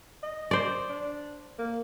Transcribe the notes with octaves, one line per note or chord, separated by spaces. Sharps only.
D#5
C5 D5
D4
A#3